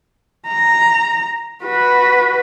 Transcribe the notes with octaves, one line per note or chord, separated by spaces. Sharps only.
A#5
F#4 B4